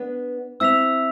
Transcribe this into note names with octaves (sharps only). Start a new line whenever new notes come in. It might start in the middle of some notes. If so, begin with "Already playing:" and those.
Already playing: B3 D4
C4 E4 E6 B6 F7